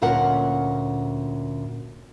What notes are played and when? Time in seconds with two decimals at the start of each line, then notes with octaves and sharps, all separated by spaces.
0.02 D2 A#2 C#4 A#4 F#5